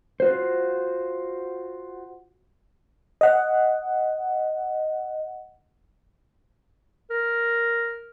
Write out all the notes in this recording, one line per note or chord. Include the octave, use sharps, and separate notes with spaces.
F4 F#4 C5
D#5 F#5
A#4